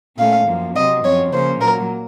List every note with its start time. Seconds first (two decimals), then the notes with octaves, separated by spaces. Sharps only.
0.18 A#2 A3 C#4 F5
0.47 F#2 F3 A#3
0.75 C3 F#3 C4 D#5
1.04 F#2 F3 C4 C#5
1.33 C#3 F3 A#3 C#4 C5
1.61 A#2 F#3 A#3 A#4